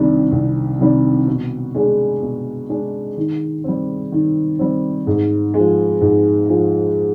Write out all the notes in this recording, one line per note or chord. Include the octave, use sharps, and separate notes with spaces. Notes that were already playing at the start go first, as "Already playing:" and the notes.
Already playing: C2 C3 D#3 G3 D4
C2
C3 D#3 G3 D4
B2
G#3 D4 G#4
B2
G#3 D4 G#4
D#3
G3 C4
D#3
G3 C4
G#2
G#3
F3
G#2
F3 G#3